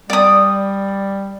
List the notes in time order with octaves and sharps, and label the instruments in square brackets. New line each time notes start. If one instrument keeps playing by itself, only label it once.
[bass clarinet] G3 [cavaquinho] D5 D#6